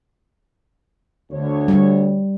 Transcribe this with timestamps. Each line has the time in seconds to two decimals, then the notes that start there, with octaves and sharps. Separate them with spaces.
1.30 D2 C#5
1.68 G3